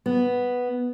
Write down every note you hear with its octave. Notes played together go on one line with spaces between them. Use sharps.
B3